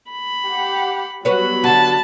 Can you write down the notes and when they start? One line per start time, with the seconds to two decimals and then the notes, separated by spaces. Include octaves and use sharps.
0.11 B5
0.47 G4 F#5
1.25 F#3 G3 B3 F#4 B4 C#5 B5
1.64 D3 F#4 A5